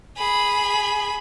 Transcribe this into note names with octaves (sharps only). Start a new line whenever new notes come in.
G#4 B5